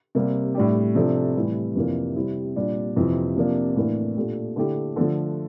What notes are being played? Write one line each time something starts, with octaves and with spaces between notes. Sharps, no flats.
C3 G3 A#3
A2 G3 D4 G4
C3 F3 A3 D4
A2 E3 G3
F2 C3 E3 A#3 D4
C3 G3 C4 E4 G4
A#2 G3 D4
F2 C3 E3
C3 F3 A#3 D4
A2 E3 A#3 D4
A#2 A3 D4 G4
D3 A3 E4 G4
D3 F3 A3